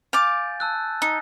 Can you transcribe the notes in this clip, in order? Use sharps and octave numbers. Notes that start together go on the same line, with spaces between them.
F5 G#5 D6 G6 A6
A5 E6 F#6
D#4